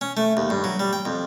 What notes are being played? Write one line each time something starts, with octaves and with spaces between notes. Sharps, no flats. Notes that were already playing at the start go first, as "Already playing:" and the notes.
C#4
A3
D#2
G2
F#3
G3
G5
F2